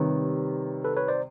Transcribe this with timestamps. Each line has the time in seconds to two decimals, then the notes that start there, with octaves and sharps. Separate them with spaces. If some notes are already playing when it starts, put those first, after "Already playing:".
Already playing: C3 D#3 G3 B4 C#5
0.84 A4 B4
0.96 B4 C#5
1.08 C5 D5